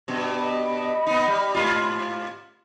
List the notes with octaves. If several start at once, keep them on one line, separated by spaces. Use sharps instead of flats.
G2 B2
D#5 B5
B3 D#4
G3
G#2 F4